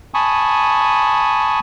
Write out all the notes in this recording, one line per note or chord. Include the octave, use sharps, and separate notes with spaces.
G#5 A5 B5 C#6 D#6